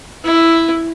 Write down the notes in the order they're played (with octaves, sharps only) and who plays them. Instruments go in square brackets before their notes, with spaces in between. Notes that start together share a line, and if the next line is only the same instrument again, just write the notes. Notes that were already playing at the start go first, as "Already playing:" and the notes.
[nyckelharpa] E4